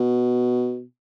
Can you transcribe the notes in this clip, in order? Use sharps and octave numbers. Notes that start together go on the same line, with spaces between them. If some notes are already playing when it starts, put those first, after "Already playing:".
Already playing: B2